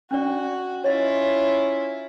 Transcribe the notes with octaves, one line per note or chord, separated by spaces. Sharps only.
C#4 D4 F#4 D5
C#4 E4 F4 C#5 D#5